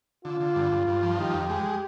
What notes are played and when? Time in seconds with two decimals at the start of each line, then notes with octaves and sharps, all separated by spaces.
0.25 D3 F4
0.40 D3
0.56 G2
0.72 G2
0.87 G2
1.03 F3
1.18 D#3 G4
1.34 F2
1.49 G#3